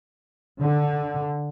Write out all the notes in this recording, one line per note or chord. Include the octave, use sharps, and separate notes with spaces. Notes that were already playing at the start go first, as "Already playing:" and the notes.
D3